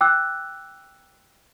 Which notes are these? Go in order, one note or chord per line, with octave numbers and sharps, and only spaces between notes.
G5 D6 E6 F#6